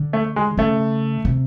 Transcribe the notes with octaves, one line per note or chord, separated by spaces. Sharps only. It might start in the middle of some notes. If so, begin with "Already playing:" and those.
Already playing: D3
A3
G#3
C#3 A3
C3